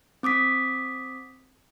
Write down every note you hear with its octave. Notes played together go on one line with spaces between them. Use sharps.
C4 D6 D#6 B6